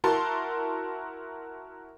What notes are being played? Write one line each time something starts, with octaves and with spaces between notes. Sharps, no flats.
E4 F#4 A#4 A5 C6